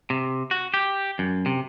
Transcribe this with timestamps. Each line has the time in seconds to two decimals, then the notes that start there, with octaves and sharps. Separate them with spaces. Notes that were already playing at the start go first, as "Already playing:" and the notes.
0.10 C3
0.51 F#4
0.74 G4
1.19 F#2
1.46 C3